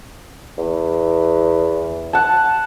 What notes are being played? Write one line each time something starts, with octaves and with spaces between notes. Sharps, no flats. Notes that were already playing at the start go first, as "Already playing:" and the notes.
E2
F#5 A5